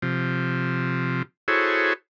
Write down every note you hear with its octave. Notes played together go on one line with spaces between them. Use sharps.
C3 F3
E4 F#4 G#4 A4 C5 C#5